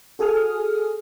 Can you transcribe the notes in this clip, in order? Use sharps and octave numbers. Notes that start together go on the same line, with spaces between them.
F#4 G#4 A4 G#5 D#6 F6